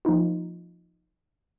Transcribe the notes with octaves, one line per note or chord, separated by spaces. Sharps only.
F3 A#3 D#4 F4